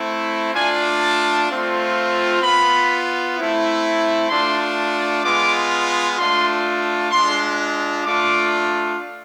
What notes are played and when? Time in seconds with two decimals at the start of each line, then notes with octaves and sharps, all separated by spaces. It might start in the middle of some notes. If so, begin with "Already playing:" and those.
Already playing: A3 C4 E4
0.54 A3 D4 F4 G#5
1.02 A5
1.48 A3 C4 F4
2.42 B3 F4 B5
3.37 A3 C4 E4
4.29 A3 D4 F4 C6
5.24 G#3 B3 F4 D6
6.17 A3 D4 F4 C6
7.11 G#3 D4 F4 C6
8.05 A3 D4 F4 D6